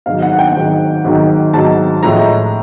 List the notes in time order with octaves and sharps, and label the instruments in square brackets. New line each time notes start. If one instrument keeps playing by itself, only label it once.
[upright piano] G#2 D#3 F#3 F5
F#5
F#5
G5
G#2 D#3 F#3
G#2 D#3 F#3
G#2 D#3 F#3 A5
A2 F3 G#3 A#5